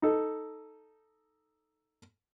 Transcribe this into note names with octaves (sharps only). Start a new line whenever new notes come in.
D#4 A4